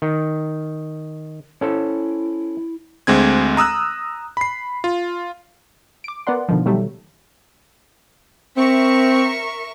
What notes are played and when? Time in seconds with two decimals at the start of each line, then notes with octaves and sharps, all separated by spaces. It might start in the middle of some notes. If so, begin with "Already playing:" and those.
0.02 D#3
1.61 C#4 E4 A4 C5
3.07 D2 G#3 C4 G#6
3.57 A#5 D#6 E6 F#6
4.37 B5 C7
4.84 F4
6.04 D6 D7
6.27 B3 A#4 D5 F#5 C6
6.49 B2 D3 D#3 F3
6.66 B2 D#3 F#3 G3 A3
8.57 C4 A#4 E5 C#6